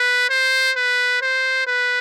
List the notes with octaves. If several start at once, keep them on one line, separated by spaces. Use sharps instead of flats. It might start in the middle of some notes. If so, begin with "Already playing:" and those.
Already playing: B4
C5
B4
C5
B4